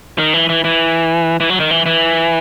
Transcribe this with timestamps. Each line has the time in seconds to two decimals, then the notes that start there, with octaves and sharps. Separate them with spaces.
0.18 D#3
0.34 E3
0.49 E3
0.64 E3
1.40 E3
1.50 F#3
1.60 D#3
1.71 E3
1.86 E3